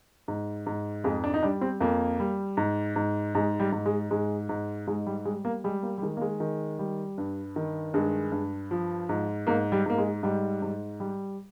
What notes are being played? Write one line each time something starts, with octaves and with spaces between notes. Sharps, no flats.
G#2
G#2
F2 G#3
D4
D#4
G3 D4
C4
F2 A#3
G3
G#2
G#2
G#2 G#3
G3
G#2
G#3
G#2 G#3
G#2
G#2 G#3
G3
G3 G#3
A#3
G3 G#3
A#3
G3
D#3 G#3
A#3
G#3
D#3
G3
G2
D#3
G2 G#3
G2
F3
G#2
G#2 A#3
G3
G#2 A#3
G#3
G#2 G3
G#2
G3